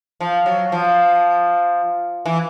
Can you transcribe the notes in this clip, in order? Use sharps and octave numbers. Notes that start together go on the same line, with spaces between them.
F3
F#3
F3
E3